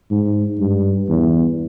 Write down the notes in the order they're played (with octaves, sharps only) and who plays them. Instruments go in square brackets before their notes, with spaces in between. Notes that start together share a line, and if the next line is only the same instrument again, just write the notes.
[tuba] G#2
G2
E2